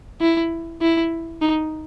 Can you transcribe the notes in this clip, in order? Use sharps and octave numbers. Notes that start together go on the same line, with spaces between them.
E4
E4
D#4